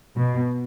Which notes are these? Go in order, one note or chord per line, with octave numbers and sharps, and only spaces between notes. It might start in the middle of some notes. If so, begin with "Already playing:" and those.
B2